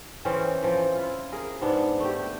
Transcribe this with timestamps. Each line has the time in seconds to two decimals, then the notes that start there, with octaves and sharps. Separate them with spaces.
0.25 E3 C4 C#4 G#4
0.63 E3 F3
0.95 E4 F4
1.32 G#4 A#4
1.61 G#2 B3 D4
2.00 A3 G4